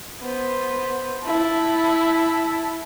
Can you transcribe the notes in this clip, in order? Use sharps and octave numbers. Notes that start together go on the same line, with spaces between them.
B3 C5
E4 A5